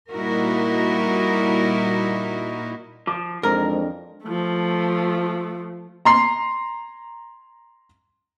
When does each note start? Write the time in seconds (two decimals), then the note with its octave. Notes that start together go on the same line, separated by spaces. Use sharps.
0.10 A#2 G3 D#4 E4 F#4 A#4
3.07 F3 D6
3.43 F2 G#2 E3 D4 A#4 A#5
4.23 F3 A3
6.05 A#5 C6 C7